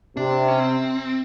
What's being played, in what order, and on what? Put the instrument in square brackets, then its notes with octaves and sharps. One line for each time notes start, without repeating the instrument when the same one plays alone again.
[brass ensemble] C3 [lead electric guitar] D4
[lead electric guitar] C#4
C4